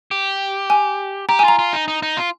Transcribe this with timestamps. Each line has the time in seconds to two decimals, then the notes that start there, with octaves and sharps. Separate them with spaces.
0.11 G4
0.70 G#5
1.29 G4 A#5
1.39 G#5
1.44 F4 A#5
1.59 F4
1.73 D#4
1.88 D#4
2.03 D#4
2.17 F4